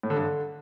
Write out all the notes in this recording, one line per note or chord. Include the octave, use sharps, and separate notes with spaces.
A2
D3
G2
D3